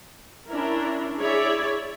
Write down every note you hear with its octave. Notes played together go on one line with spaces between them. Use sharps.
C#4 D4 E4 A#4
E4 G#4 C#5 D5 E5